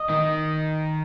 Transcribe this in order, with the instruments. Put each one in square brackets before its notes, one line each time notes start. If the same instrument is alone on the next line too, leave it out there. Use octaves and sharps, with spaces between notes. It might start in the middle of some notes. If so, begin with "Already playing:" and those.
Already playing: [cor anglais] D#5
[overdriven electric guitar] D#3